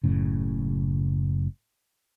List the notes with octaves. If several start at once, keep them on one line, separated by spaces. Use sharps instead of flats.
F#1 F#2 A2 C#3